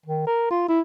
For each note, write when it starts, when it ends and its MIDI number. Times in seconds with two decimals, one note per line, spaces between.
0.06 0.25 51
0.27 0.47 70
0.51 0.65 65
0.68 0.80 64